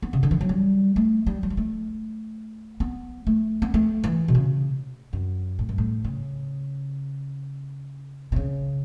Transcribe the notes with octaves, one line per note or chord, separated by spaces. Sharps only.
B3
C#3
D3
E3
F#3
G3
A3
G3
F#3
G3
A3
B3
A3
B3
A3
E3
B2
C#3
F#2
A2
G2
A2
C#3
B2
C#3